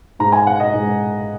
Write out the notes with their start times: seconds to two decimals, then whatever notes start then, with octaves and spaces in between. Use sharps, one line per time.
0.19 G#2 G#3 A#5
0.32 G#5
0.47 F#5
0.60 D#5
0.73 G#2 G#3